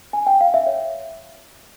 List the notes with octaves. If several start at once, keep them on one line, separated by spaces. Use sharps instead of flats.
G#5
G5
F5
E5
C#5